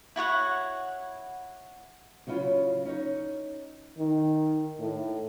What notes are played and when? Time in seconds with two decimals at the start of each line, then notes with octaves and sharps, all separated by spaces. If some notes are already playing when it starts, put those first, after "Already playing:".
0.16 E4 F#4 C#5 F#5
2.27 C#3 F#3 C#4 E4 F4
2.85 C#4 D#4 C#5
3.98 D#3
4.80 A2